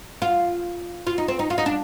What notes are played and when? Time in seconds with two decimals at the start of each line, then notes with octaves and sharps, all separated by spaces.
0.22 F4
1.07 F4
1.18 D#4
1.28 C4
1.39 D#4
1.50 F4
1.58 D#4
1.66 D4